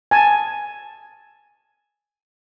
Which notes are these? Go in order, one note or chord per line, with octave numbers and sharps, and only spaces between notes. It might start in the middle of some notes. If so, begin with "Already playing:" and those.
G#5 A5